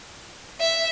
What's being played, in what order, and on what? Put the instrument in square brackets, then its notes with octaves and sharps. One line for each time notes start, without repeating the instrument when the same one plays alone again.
[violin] E5